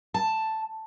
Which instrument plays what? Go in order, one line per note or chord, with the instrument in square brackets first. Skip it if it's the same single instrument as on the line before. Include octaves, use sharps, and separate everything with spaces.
[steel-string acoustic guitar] A5